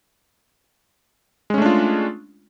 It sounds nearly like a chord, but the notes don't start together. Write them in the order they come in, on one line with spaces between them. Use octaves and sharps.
G#3 C#4 A3 D4 F4